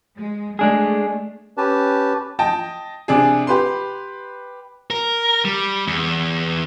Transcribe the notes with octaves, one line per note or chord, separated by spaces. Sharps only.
G#3
G#3 A3 D4 G#4
C#4 G4 B4 A5
D#5 G5 A5
C3 D4 G#4
G4 B4 C6
A#4
G3
E2